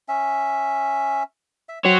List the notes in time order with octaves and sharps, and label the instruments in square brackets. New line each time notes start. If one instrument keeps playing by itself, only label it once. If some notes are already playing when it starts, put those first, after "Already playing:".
[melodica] C#4 E5
E5
[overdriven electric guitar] F#4 C#5 [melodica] C5 G5